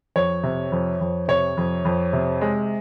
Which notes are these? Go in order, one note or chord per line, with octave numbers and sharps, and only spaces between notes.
F2 C#5
C3
F2
F2
C3 C#5
F2
F2
C3
G#3